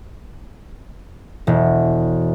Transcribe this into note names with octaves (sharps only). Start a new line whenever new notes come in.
E1